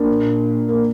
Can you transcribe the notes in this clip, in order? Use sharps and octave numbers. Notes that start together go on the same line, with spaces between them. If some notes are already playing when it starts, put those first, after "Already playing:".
Already playing: A#3 D4
A#2
A#3